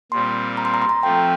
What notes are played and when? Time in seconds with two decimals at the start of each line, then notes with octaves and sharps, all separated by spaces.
0.12 A#2 G3 C4 C6
0.57 A#5
0.65 C6
0.74 A#5
0.82 C6
0.89 A#5
1.03 F3 A3 C4 G5